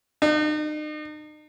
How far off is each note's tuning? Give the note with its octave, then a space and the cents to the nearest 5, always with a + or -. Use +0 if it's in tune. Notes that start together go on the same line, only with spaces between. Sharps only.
D#4 -40